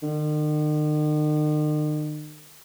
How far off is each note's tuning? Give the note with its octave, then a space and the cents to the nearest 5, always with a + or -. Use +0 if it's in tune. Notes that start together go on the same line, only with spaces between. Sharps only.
D#3 -45